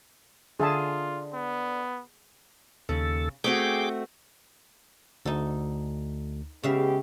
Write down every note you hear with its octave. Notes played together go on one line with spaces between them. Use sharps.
D3 F4 G#4 E5 A5
B3
D#2 C#3 A4
A3 C4 F#4 G#4 G5 D6
D2 D#4 A4
C#3 G#3 B3 G4 E5 F5